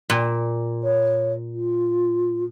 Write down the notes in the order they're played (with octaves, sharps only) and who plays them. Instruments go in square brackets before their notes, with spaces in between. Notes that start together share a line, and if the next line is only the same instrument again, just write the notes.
[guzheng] A#2
[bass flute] C#5
F4